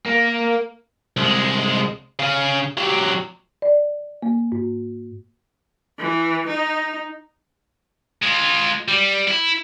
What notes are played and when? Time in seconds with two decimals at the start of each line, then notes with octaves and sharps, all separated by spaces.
0.06 A#3
1.17 C2 G#3
2.19 C#3 C#4
2.78 F#3 G4
3.62 D5
4.22 A#3
4.52 G#2
5.99 E3
6.47 D#4
8.23 G#3 F4
8.88 G3
9.28 E4